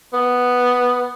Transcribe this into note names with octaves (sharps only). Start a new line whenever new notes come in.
B3